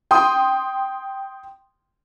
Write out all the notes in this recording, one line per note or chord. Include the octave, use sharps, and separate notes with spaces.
G5 C6 D#6